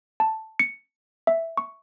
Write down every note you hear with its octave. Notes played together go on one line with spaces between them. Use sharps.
A5
C#7
E5
C#6